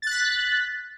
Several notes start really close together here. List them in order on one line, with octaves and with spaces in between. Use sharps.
A6 F#6 B6